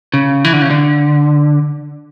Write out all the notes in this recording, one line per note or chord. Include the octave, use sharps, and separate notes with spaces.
C#3
E3
D3
C#3
D3